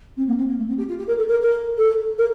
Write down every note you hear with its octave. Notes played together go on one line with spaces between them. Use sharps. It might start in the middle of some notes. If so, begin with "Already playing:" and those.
C4
A#3
C4
A#3
A3
C4
G4
F4
G4
A#4
A4
A#4
A#4
A4
A#4